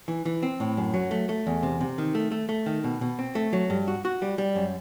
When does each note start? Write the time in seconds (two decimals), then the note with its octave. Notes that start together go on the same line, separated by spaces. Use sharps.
0.08 E3
0.25 E3
0.43 C4
0.60 A2
0.77 F#2
0.94 F#3
1.11 A3
1.29 A3
1.47 E2
1.63 C3
1.81 C3
1.98 D#3
2.15 A3
2.32 A3
2.49 A3
2.66 D#3
2.84 B2
3.01 B2
3.19 C4
3.35 A3
3.53 F#3
3.70 G2
3.88 F#4
4.05 F#4
4.22 G3
4.38 G3
4.56 F#2